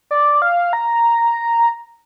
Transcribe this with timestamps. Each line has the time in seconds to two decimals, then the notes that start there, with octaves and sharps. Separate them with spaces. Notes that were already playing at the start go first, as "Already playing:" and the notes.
0.11 D5
0.42 F5
0.73 A#5